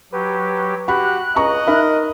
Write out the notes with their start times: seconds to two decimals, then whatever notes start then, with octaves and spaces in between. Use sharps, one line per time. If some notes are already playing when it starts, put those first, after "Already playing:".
0.12 F#3 G4 B4
0.88 F#4 G4 B5 F#6
1.36 C#2 D#5 A#5 C#6
1.67 D#4 A#4 E5 B5